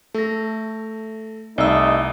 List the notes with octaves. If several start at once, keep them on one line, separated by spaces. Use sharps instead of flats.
A3 A4 A#6
C2 A3 D#4 D5 E6